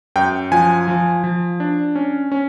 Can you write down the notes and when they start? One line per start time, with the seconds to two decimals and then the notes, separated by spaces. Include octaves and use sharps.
0.16 F#2 G5
0.52 F3 G#5
0.88 F3
1.24 F3
1.60 D4
1.95 C#4
2.32 C#4